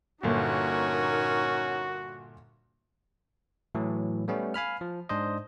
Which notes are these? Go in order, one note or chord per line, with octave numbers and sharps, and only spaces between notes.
G1 A#2 C#4 D#4 F#4 A#4
A2 E3 F#3
G3 A3 B3 C#4
F5 G#5 B5 F6
F3
G#2 D4 C5 D#5